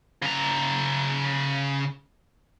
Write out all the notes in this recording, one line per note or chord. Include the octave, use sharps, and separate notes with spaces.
C#3 A#5